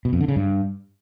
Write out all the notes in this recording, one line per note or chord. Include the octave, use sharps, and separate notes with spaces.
B2
F2
D3
C#3
G2